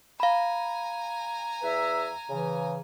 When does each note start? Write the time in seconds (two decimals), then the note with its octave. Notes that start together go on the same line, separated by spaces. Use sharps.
0.20 F5 G#5 A#5 B5
1.62 E2 B4 E5
2.29 C#3 E3